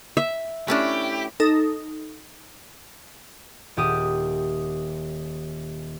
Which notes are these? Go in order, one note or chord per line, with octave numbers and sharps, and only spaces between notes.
E5
A3 C#4 D4 E4 G4
D#4 A4
D#1 G4 D#6